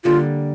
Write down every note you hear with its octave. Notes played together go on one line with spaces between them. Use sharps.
D3 G3 A#3 F4